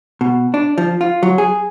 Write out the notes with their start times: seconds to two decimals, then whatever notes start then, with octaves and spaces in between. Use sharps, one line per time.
0.21 B2
0.54 D4
0.78 F3
1.01 F4
1.23 F#3
1.38 G#4